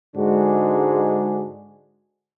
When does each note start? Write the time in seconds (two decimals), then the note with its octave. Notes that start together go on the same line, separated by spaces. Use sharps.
0.17 G#2 D3 G#3 D4 F#4 G#4